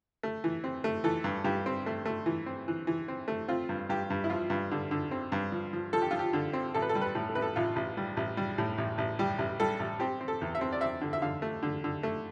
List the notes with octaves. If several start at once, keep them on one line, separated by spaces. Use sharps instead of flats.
A3
E3
C4
A3
E3 A4
G2
G2 G4
C4
A3
A3
E3
C4
E3
E3
C4
A3
C4 F4
G2
G2 G4
G2
E4
F3 F4
G2
D3
D3
C4
G2
F3
F3
F3 A4
G4
F3 F4
G4
D3
C4
A1 A4
B4
A4
G3
B4
A2
A4
A1 B4
A4
A1 F4
A1
G3
A1
G3
A2
A1
A1
G3 G4
A1
G3 A4
A1
C4 G4
C4
A4
E2
E5
C4
D5
C4 E5
D3
E5
D3 F5
A3
D3
D3
A3